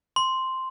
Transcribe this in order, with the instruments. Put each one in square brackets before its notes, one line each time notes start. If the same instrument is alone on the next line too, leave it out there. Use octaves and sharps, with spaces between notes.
[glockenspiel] C6